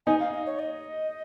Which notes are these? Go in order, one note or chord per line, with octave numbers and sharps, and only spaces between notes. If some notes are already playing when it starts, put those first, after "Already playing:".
D#4 G#5
F5
D#5
C#5
D#5